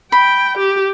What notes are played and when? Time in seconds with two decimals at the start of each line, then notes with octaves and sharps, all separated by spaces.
0.12 G5 B5
0.57 G4